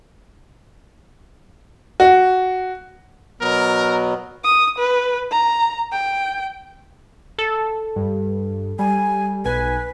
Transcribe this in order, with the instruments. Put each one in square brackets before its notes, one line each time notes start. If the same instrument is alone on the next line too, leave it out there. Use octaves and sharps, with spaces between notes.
[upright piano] F#4
[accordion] B2 F#3 B3 [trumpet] A#4
[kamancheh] D#6
B4
A#5
G5
[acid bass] A4
[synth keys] G2
[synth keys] G3 [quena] G#5
[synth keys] B1 G#5 [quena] B4